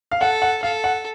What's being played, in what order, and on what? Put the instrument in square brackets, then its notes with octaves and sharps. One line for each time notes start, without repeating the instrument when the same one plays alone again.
[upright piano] F5
[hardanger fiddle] A4 [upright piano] F#5
[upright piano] F#5
[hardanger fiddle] A4 [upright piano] F5
[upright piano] F#5